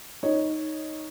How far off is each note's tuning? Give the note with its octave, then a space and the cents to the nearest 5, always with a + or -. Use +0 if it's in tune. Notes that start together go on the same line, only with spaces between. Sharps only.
D#4 +0 C#5 +0